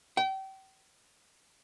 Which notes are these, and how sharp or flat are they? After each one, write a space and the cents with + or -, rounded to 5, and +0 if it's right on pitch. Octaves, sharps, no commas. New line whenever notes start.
G5 -30